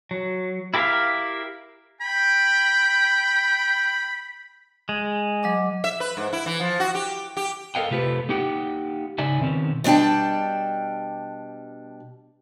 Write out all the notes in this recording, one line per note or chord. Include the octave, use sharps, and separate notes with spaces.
F#3
E4 G4 A#4 E5 F5
G5 B5
G#3
F#3 D#5 D6
E5
B4
G#2
E4
E3
F3
F#4
G4
G4
A4 A#4 D#5 F5 G5
C3 A3 F4 G4 B4
A#3 D#4 G4 F#5 G5
C#3 D#4 D5 E5 G#5
B2 D#3 C4 C#4
B2 G3 D4 G5 A5